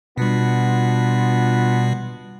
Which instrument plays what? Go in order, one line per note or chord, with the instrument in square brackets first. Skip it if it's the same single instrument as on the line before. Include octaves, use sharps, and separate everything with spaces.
[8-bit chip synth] B2 G3 [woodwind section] B3 D4 F4